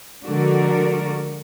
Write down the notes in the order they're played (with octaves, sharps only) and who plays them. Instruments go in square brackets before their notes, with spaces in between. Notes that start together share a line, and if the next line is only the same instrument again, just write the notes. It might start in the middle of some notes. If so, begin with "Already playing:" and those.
[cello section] D3 F3 G#3 F#4 A#4 D5